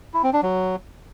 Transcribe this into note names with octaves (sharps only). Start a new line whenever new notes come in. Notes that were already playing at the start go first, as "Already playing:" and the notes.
E4
C4
D4
F#3